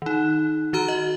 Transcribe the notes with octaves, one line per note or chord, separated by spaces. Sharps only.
D#3 D#4
D#3 F#4 A#5 F6
D#5